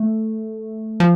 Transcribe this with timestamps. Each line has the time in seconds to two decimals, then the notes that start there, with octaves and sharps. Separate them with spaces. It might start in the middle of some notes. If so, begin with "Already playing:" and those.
Already playing: A3
1.00 F3